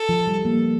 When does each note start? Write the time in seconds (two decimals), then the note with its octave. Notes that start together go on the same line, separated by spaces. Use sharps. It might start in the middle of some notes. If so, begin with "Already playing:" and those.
Already playing: A4
0.09 F3
0.27 G3
0.45 A#3